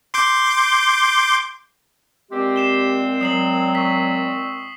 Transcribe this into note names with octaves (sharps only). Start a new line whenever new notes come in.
C6 D6 G6
A#2 G#3 C4 G4
C7 E7 G7
F#3 D#6 C7 F#7
C#6 B6